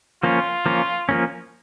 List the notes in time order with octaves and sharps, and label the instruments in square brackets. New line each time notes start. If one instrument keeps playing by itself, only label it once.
[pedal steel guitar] F3 A#3 C#4 [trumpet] F4
[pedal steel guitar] F3 A#3 C#4
F3 A#3 C#4